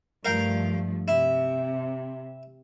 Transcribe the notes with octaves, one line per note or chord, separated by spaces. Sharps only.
G2 F3 A3 A#4 F5 G5
C3 E4